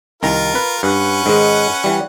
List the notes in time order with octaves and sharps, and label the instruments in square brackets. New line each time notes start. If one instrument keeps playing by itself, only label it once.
[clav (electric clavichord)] C2 D#3 A#5 [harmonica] F4 A#4
[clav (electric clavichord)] B4
[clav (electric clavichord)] G2 [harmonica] C#4 B4 F#5
[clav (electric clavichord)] G#2 D#3 G#3
E3 G3